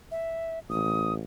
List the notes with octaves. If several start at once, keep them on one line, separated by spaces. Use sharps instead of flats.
E5
A1 D#6